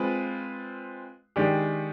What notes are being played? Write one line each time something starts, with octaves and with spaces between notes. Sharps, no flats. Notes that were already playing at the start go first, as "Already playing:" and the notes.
Already playing: G#3 C4 F4 B4
D#3 G#3 D4 G4